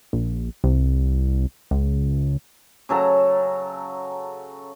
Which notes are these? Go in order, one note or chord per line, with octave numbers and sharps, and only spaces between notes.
A#1
C2
C#2
C#3 F#3 A4 A#5